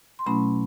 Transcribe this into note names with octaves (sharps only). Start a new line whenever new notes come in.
C6
B2 F#3 A3 C#4 E4 B5